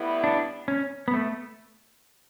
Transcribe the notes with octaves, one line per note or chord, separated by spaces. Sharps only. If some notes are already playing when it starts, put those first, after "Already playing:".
Already playing: A2 G3 B3 E4
D4
C#4
B3
A3